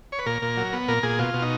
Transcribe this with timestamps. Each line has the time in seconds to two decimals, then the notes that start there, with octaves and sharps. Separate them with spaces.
0.12 C#5
0.19 B4
0.26 A#2 A#4
0.42 A#2
0.57 F#3
0.73 B3
0.88 A#2 A#4
1.03 A#2 G#4
1.19 B2 F4
1.34 B2
1.42 D#4